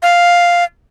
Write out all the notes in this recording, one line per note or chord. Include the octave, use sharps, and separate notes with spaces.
F5